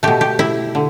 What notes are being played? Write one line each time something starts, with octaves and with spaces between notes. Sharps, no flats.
B2 A3 G4
G4
E4
D3